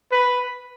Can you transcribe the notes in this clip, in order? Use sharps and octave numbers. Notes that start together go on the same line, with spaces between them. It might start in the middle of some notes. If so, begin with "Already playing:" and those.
B4